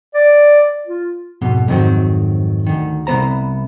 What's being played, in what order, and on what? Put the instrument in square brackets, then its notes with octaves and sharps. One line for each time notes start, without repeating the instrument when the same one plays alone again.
[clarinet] D5
F4
[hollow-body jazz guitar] F2 G#2 B2
F2 G#2 D#3 F#3 C4
D2 D#3
C2 G#2 B3 C5 A#5